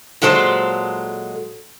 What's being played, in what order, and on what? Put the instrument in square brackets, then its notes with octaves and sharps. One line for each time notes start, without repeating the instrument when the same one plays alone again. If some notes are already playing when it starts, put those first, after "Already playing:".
[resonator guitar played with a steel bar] A#2 F#3 G#3 A4 C5